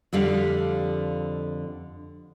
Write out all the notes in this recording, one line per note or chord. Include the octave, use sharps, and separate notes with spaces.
F2 D3 G3 F5